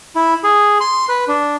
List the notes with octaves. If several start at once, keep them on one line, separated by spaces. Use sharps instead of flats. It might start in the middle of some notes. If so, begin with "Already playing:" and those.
E4
G#4
C6
B4
D4